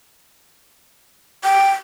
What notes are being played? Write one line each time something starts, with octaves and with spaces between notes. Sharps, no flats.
G5